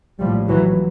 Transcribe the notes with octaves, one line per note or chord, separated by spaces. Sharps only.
A#1 A2 F3 G3
E3 F#3